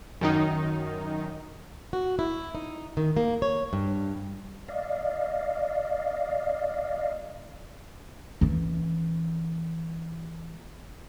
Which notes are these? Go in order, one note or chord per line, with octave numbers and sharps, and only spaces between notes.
F#2 D#3 D#4
F#4
E4
D#4
D#3
A#3
C#5
G2
D5 D#5 F5
E3 C#4